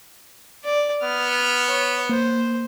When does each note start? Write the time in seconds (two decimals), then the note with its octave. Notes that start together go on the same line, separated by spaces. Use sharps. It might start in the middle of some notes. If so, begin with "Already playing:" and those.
0.64 D5
1.03 B3 F6
1.69 C#5
2.09 A#3 C5